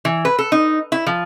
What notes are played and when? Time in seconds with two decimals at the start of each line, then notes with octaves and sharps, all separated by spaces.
0.05 E3
0.25 B4
0.39 A4
0.52 D#4
0.92 E4
1.07 F3